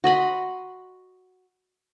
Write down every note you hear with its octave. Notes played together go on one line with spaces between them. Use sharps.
F#4 D#5 B5 C6